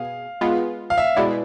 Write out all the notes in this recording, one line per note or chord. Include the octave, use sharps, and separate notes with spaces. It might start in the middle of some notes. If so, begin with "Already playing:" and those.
Already playing: B2 G#4 F5
G#3 B3 F4
F5
E5
B2 G#3 B3 E4 D5